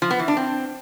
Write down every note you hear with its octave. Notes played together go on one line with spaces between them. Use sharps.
F3
B3
E3
D4
C4